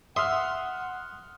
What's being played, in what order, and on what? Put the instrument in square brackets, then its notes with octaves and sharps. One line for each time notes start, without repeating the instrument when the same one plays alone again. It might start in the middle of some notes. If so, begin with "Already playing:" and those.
[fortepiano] E5 [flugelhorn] F#5 [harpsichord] C6 [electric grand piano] D#6 F6